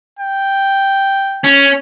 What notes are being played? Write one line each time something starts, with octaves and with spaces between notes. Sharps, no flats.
G5
C#4